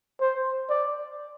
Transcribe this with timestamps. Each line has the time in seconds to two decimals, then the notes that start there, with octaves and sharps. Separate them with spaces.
0.21 C5
0.70 D5